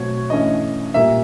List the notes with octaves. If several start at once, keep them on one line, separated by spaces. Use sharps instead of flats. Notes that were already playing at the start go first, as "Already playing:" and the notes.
Already playing: B2 F#3 A3 C4 C#5
G2 E3 A3 C#4 D#5
A#2 G3 A#3 E5